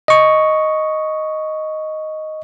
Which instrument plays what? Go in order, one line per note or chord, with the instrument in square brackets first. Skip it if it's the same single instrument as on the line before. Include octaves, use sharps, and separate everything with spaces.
[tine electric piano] D#5 C#6